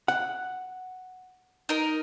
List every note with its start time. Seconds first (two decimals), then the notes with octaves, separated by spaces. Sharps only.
0.08 F#5
1.69 D#4 A#4